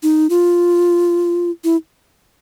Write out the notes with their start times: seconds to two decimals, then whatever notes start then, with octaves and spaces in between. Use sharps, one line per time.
0.03 D#4
0.30 F4
1.64 E4